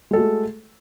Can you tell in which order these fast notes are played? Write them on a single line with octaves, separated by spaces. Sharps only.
G#3 A4 F#4 A3